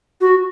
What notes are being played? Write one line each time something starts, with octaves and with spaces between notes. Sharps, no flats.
F#4